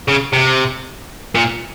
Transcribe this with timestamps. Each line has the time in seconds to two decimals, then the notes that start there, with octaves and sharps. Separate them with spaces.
0.08 C#3
0.33 C3
1.35 A#2